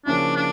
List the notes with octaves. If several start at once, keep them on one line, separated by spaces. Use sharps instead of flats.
C#3 F3 A#3 C#4 D4 E4
D4